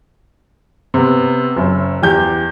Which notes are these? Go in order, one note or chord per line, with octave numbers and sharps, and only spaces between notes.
C3 B3
F#1 F#2
E2 G4 G6